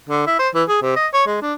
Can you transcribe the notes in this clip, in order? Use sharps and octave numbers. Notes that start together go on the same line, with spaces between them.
D3
E4
C5
E3
G#4
C3
D#5
C#5
G#3
D4